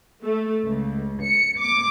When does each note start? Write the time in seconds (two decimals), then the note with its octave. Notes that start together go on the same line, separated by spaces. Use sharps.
0.23 A3
0.64 C#2
1.22 C#7
1.59 D6